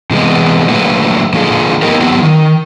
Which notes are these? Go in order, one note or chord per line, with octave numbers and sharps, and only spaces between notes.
C3 E3 G#3 B3
D3 F#3 A3 A#3 B4
D3 F3 A#3 F4 G#4 A4
A#3 B3 D#4 G4 A#4
F#3 B3 C4 E4 G4
D#3